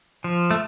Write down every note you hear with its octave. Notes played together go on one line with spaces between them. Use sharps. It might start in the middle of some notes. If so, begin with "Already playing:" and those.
F3
A3